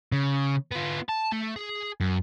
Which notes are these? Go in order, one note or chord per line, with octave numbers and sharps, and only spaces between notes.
C#3
B3 F4
A5
A3
G#4
F#2